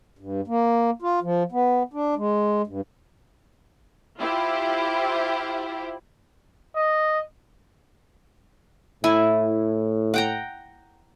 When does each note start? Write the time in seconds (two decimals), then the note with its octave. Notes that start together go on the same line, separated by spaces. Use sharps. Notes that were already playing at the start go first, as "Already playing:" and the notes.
0.19 G2
0.48 A#3
1.02 F4
1.22 F3
1.52 B3
1.94 D4
2.17 G#3
2.67 G2
4.19 E4 F4 G4 C5
6.75 D#5
9.04 A2 E4 G#5
10.14 F#5 G5 A#5